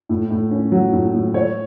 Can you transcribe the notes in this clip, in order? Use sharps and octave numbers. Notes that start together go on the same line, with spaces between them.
A2
A2
C#4
F#3
A2
A2
C#5